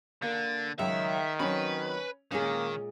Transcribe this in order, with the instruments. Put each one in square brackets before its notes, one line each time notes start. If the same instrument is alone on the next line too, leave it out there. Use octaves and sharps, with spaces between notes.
[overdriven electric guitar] D3 [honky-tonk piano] A#3
[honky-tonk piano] C#2 [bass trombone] D#3 [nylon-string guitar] F#3 [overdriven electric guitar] E5
[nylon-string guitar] F#3 C4 F#4 [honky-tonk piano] C#4 [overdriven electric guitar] B4
[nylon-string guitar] A#2 G#3 G#4 [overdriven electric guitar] D#3 [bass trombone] A#3 [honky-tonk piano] C#4